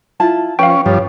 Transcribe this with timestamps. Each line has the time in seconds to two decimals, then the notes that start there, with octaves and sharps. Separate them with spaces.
0.20 E4 F4 A5
0.59 F3 C#4 B4 F5 G5
0.86 G2 F3 C#5